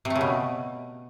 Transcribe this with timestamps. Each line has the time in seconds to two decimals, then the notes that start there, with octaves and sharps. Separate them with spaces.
0.05 C3
0.10 A3
0.16 C#3
0.21 B2